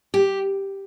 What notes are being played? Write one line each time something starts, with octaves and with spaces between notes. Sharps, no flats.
G4